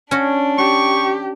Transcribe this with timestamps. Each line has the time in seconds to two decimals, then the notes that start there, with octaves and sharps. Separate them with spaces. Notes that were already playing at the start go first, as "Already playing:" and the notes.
0.11 C#4 D4 F#4
0.58 G4 C#6